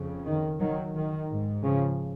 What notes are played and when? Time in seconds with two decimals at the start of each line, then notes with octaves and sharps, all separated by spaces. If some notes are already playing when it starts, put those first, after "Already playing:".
Already playing: F2 C#3
0.25 D#3
0.60 D#3 F#3
0.95 D#3
1.30 G#2
1.63 C#3 F3